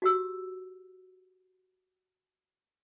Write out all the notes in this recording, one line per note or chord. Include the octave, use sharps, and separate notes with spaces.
F#4 G4 E6